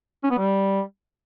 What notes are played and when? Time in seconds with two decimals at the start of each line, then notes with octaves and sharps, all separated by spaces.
0.23 C#4
0.31 B3
0.38 G3